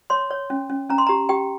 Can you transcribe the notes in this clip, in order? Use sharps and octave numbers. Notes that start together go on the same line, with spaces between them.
C#5 C6
C#5
C#4
C#4
C#4 A#5
C6
G4 A#5
G4 G5